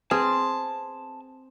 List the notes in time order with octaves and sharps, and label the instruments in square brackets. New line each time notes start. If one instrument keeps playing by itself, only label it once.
[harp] C4 [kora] G#4 [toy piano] B4 [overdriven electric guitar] A5